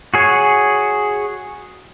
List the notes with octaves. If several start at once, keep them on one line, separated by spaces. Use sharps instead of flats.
F#4 G#4 C#5